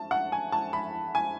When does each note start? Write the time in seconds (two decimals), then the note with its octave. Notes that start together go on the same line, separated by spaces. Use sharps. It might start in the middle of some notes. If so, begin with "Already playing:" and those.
Already playing: A5
0.11 F#5
0.32 G#5
0.52 A5
0.73 B5
1.15 G#5